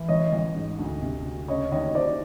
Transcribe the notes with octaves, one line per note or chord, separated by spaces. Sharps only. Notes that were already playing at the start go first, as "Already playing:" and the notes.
Already playing: E3
A1 C#5 D#5
A1
G#2
D2
C3
D2
C#3 C#5 D#5
D#2 C#5 D#5
D#2 C5 D5